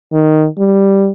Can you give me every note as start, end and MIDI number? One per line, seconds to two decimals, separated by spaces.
0.13 0.47 51
0.58 1.11 55